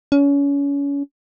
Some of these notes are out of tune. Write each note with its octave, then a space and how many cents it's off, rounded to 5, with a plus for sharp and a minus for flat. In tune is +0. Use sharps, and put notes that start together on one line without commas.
C#4 +30